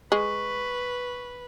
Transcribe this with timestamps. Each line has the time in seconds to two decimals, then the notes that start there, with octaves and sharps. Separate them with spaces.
0.12 G#3 B4 C#6